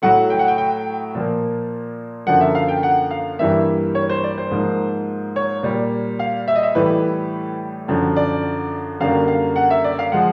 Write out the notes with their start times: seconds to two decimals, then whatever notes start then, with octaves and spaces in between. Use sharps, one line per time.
0.02 A2 F#3 A3 F#5
0.30 G5
0.39 F#5
0.48 G5
0.58 G5
1.15 A#2 F3 A#3
2.26 F#2 D3 F3 A#3 F#5
2.41 E5
2.55 F5
2.68 G5
2.83 F#5
3.11 F5
3.39 G2 E3 G3 A#3 E5
3.95 C#5
4.09 C5
4.24 D5
4.38 C5
4.51 G#2 F3 A#3
5.36 C#5
5.63 A#2 G3 A#3
6.19 F5
6.48 E5
6.56 D#5
6.63 E5
6.75 A2 E3 G3 B4
7.88 F#2 D3 F3
8.16 D5
9.00 F#2 D3 G3 A#3 F5
9.28 F5
9.56 F#5
9.70 E5
9.84 D5
9.99 F5
10.12 F3 G#3 F#5